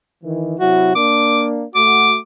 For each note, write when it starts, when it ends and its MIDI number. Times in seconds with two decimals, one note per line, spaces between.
0.24 0.56 51
0.24 0.56 52
0.60 0.94 48
0.60 0.94 54
0.60 0.94 64
0.60 0.93 66
0.95 1.63 58
0.95 1.63 62
0.95 1.43 86
1.75 2.17 57
1.75 2.17 66
1.75 2.15 86